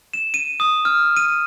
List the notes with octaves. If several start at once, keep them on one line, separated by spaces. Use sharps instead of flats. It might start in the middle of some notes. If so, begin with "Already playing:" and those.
E7
D#7
D#6
F6
D#7